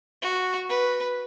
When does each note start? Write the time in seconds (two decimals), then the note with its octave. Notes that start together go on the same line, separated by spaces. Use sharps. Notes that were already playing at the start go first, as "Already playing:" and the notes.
0.22 F#4
0.69 B4